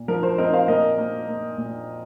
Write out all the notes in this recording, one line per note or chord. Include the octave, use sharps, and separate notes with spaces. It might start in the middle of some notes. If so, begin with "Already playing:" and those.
Already playing: A#2
F3 A#4
C5
C4 A#4 D#5
C5 F5
A#2 A#4 D#5
A#3
A#3
A#2